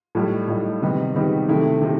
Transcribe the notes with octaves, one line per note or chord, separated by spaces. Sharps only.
A2 G3 D#4
A2 G3 D#4
C3 D#3 G3 B3 D#4
C3 D#3 G3 B3 D#4
C3 D#3 A3 E4
C3 D#3 A3